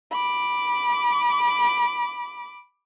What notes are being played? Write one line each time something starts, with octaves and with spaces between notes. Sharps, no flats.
B5 D6